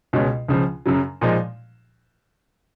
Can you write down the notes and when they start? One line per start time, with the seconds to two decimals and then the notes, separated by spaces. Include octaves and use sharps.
0.13 C#2 B2 G#3 C#4
0.48 C#2 C#3 F3
0.86 F#2 C#3 F#3
1.21 A#2 F3 G#3 D#4